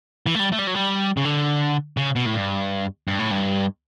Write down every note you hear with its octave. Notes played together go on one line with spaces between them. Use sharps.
E3
A3
G3
A3
G3
F#3
G3
C#3
D3
C#3
B2
A2
G2
G2
A2
G2